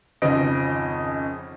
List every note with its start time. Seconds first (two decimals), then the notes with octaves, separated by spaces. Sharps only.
0.22 G#1 F2 C#3 F3 D#5 D7